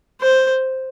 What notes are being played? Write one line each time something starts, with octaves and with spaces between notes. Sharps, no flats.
C5